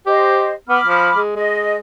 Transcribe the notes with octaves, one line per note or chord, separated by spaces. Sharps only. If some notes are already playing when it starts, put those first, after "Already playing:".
G4 C5 D#5
B3 B5 D6 F6
F3
G#3
G#3 D#5